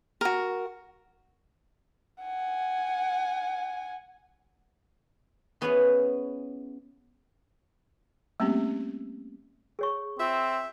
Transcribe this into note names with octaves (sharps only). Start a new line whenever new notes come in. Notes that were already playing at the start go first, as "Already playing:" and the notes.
F#4 A#4
F#5 G#5
E3 B3 C#4 G#4 B4 C#5
G3 A3 A#3 C4 C#4 G4
G#4 C#5 C#6
C4 F4 E5